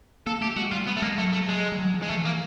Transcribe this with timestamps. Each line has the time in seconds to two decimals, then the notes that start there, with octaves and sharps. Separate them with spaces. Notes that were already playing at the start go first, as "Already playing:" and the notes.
0.26 A#3 A4
0.41 A3 G4
0.56 G#3 F#4
0.71 G3 F4
0.87 B3
0.97 A3
1.02 G#3 A#3
1.18 F#3 A3
1.33 A3
1.49 G#3
1.72 G3
1.79 F#3
1.94 F3
2.03 G#3
2.09 E3 A3
2.25 A#3